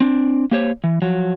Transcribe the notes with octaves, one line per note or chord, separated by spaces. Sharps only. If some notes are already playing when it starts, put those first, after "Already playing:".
C4 D4
A#3 G4 C5 C#5
E3
F3 F#3